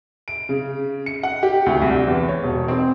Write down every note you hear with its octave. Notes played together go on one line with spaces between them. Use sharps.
D7
C#3
C#7
F#5
G4
D2
C2
E2
C#5
E1
C4